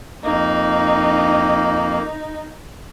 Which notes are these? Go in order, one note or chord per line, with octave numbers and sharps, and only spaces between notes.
F2 A#3 D#4